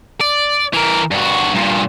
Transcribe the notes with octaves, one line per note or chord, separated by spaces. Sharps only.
D5
E3 A#4
G2 F#4
G2 A#2